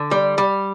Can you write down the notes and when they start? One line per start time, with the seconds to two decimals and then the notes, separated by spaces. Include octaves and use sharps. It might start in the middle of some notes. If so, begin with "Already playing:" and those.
Already playing: D3
0.11 G3
0.38 G3